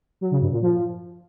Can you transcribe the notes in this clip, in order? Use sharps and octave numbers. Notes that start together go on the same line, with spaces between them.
F#3
C#3
G2
A#2
F3